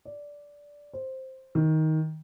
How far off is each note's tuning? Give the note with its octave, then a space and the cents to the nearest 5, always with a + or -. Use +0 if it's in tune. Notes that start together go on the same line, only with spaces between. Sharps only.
D5 -10
C5 +5
D#3 +15